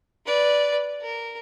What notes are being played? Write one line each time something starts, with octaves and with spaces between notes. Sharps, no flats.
B4 D5
A#4